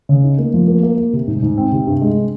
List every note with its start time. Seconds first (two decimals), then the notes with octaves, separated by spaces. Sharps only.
0.09 C#3
0.24 D#4
0.38 A#3
0.54 F3
0.68 A#3
0.83 A#3
0.98 A#3
1.13 C3
1.28 G#2
1.42 G#2
1.58 C4
1.72 C3
1.87 G2
2.02 G#3